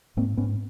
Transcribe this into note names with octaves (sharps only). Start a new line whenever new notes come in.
G#2 A#3 C4
G#2 B3 C#4